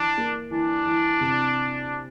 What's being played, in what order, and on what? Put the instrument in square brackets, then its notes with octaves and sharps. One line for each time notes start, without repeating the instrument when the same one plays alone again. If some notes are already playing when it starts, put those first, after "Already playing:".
Already playing: [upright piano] E3 [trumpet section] D4
[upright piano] A#3
[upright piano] E3 [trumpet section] D4
[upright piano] E3
C3